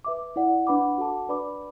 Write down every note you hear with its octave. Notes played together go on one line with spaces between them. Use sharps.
B4 E5 D6
E4 D5 F#5
D4 B4 F#5 B5 D6
F#4 A4 F#5 A5 D6
D4 B4 D5 B5 D6